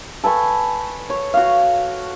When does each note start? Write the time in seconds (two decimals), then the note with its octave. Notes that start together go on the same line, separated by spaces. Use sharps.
0.24 A4 B4 G#5 C#6
1.10 C#5
1.34 F#4 F5